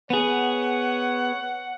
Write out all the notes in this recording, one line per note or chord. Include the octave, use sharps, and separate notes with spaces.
B3 G#4 C#5 F#5